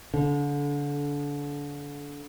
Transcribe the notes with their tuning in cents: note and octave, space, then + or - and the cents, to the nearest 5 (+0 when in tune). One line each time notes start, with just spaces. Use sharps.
D3 -30